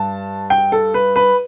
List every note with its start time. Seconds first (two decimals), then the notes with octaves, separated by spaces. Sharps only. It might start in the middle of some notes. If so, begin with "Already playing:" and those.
Already playing: G2 A5
0.50 G5
0.72 A4
0.94 B4
1.16 B4